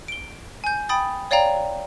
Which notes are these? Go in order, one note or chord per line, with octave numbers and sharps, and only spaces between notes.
D7 G7
G#5 G6
G5 B5 D#6 A6
C#5 D5 F5 G5 A#5